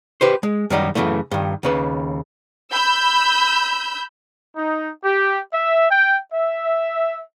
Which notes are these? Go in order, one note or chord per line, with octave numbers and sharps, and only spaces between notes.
G4 B4 C5
G#3
F#2 D#3 G3 D#4
F#2 A#2 C#3 E3 A3
G2 D#3
D#2 C#3 B4
B5 E6 G6
D#4
G4
E5
G5
E5